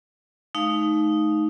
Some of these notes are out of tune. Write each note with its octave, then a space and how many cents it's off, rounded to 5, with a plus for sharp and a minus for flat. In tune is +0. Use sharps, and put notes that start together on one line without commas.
A3 -35 D#4 +0 F5 +0